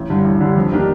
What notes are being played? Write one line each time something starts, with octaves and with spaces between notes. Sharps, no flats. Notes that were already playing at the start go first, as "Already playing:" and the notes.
Already playing: A1
G2 D3 G3
A1
G2 D3 G3
F2
D#3 A#3 D4 G4